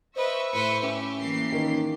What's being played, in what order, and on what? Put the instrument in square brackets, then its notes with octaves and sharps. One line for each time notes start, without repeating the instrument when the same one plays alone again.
[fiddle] B4 D#5 [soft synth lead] C5 [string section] E5 C#6 E6
[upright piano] A2 [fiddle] B4 C5 [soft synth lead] C#7
[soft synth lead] C#4 [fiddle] G4
[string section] E3 A#3 C7
[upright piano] D#3